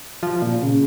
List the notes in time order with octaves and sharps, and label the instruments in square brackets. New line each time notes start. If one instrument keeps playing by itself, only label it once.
[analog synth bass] F3
A#2
C#3